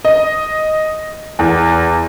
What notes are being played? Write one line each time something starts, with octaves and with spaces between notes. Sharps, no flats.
D#5
E2